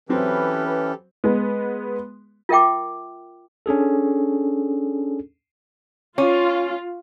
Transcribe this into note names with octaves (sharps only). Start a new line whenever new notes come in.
E3 F#3 C4 C#4 G4 A4 B4
G#3 B3
F4 A#4 E5 G5 D6
C#4 D4 G#4 A4
C#4 F4